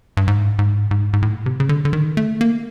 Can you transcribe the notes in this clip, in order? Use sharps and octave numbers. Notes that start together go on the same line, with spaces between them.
G2
G#2
G#2
G#2
G#2
A2
C3
C#3
D3
D3
D#3
A3
A#3